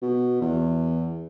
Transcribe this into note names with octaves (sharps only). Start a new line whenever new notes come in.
B2
E2